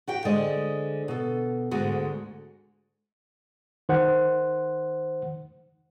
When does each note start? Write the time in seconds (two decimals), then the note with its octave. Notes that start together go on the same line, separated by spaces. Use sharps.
0.07 F#4 G4 G5
0.25 D3 G#3 C5 D5 D#5
1.08 B2 A4
1.71 D2 G#2 D3 G#3 F#4
3.89 D#3 C5 F#5